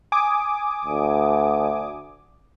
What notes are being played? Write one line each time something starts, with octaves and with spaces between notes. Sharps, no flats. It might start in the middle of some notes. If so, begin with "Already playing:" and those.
G#5 D6 D#6
D2